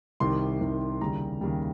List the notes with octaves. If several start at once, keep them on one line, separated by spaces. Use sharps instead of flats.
C2 C3 D#3 C6
C2 C3 D#3
D#2 C#3 G3 A#5
D#2 C#3 G3